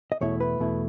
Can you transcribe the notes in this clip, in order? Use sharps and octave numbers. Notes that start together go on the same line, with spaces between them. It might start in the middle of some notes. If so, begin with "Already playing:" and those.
D#5
E2 B2 A3 E4 C#5
B4
E2 B2 A3 E4